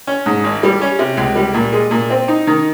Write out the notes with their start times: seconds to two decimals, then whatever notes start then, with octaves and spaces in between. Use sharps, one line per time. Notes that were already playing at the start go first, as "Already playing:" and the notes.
0.07 C#4
0.26 G#2
0.44 G#1
0.63 G3
0.82 C#4
0.99 C3
1.17 C#2
1.36 G3
1.54 A#2
1.73 G#3
1.91 A#2
2.10 C4
2.28 D#4
2.47 D#3